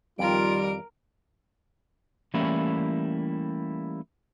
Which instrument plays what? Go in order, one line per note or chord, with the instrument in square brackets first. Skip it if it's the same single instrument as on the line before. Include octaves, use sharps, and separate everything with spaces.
[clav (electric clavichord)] F2 [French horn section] D#3 G3 [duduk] F4 [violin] A#4 D7
[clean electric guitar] E3 G3 A3 A#3 C#4 E4